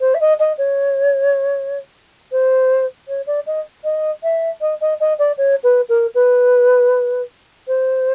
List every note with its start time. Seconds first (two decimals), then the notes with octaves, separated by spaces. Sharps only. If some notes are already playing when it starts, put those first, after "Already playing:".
0.01 C5
0.14 E5
0.20 D#5
0.39 D#5
0.58 C#5
2.32 C5
3.08 C#5
3.27 D5
3.47 D#5
3.84 D#5
4.23 E5
4.61 D#5
4.81 D#5
5.00 D#5
5.19 D5
5.38 C#5
5.64 B4
5.89 A#4
6.15 B4
7.68 C5